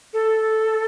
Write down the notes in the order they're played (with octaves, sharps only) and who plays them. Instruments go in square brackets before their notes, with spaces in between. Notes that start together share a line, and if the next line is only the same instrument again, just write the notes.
[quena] A4